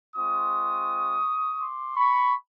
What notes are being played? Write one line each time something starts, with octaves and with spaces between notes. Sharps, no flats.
G#3 C4 F4 C#6 D#6
C6 D6
B5 C#6